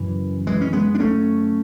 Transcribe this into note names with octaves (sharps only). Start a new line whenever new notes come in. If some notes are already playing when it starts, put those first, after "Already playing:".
Already playing: F#2 C#3 E3
E3 G#3
C#4
G#3 B3
D4
A3 C#4